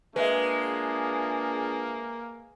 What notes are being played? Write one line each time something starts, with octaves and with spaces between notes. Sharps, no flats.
G#3 A#3 D4 F4 G#4 B4 E5